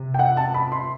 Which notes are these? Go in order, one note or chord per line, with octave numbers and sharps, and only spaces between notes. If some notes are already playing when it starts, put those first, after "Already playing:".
Already playing: C3
G5
F#5
A5
B5
C6